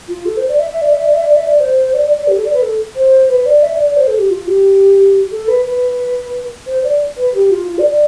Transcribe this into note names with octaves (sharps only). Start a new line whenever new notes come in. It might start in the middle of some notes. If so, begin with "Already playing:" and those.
F4
A4
C5
D5
E5
E5
D5
E5
D5
E5
D5
E5
D5
C5
D5
D5
D5
G4
A4
D5
B4
A4
C5
B4
D5
E5
D5
D5
C5
A4
G4
F4
G4
A4
B4
B4
C5
D5
B4
G4
F4
F4
D5
D5